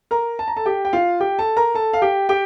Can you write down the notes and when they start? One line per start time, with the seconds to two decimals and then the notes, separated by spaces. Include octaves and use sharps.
0.11 A#4 A#5
0.39 A5
0.48 A#5
0.56 A4 A5
0.66 G4 G5
0.85 G5
0.93 F4 F5
1.20 G4 G5
1.39 A4 A5
1.57 A#4 A#5
1.74 A4 A5
1.93 F5
2.02 G4 G5
2.29 G4 G5